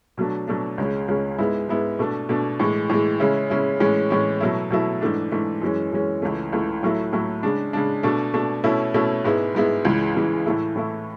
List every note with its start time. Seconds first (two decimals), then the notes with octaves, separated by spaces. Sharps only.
0.18 B2 F#3 A3 D4
0.48 B2 F#3 A3 D4
0.78 C#2 C#3 G#3 C#4
1.08 C#2 C#3 G#3 C#4
1.38 G#2 G#3 B3 E4
1.69 G#2 G#3 B3 E4
1.99 B2 A3 D4
2.29 B2 A3 D4
2.60 A2 E3 G#3
2.90 A2 E3 G#3
3.20 C#3 G#3 C#4 E4
3.50 C#3 G#3 C#4 E4
3.80 A2 E3 G#3 C#4
4.10 A2 E3 G#3 C#4
4.40 B2 F#3 A3 E4
4.70 B2 F#3 A3 E4
5.01 G#2 E3 A3 D4
5.32 G#2 E3 A3 D4
5.62 F#2 E3 G#3 C#4
5.92 F#2 E3 G#3 C#4
6.22 C#2 C#3 E3 A3
6.53 C#2 C#3 E3 A3
6.83 A2 F#3 A3 E4
7.13 A2 F#3 A3 E4
7.43 C#3 G#3 D4
7.73 C#3 G#3 D4
8.03 B2 A3 D4
8.34 B2 A3 D4
8.64 B2 A3 C#4 E4
8.94 B2 A3 C#4 E4
9.25 G#2 G#3 B3 E4
9.55 G#2 G#3 B3 E4
9.85 C#2 C#3 E3 G#3
10.15 C#2 C#3 E3 G#3
10.46 A2 E3 A3 E4
10.76 A2 E3 A3 E4